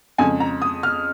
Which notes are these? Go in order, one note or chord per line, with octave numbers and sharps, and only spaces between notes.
F2 C#3 G#3 G#5
A#5
D#6
F6